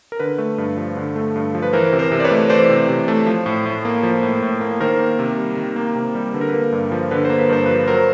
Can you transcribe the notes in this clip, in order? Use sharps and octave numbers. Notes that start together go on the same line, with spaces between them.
A#4
D3 B4
A3
G2
F3
D3
A3
G2
F3
B4
E3 A#4 C5
C3
A#4 C5
C3
D5
B4 C#5
A3
E3 C5 D5
C3
C3
A3
F3
A2
A2
A#3
F3
A2
A2
A#3
D#3 A#4 C5
A#3
C3
G3
D#3
A#3
C3
G3
D3 B4
A#4
A#3 B4
G2
F3
D3 B4
C5
A#3
B4
G2 C5
F3 B4
F#3 A#4 C5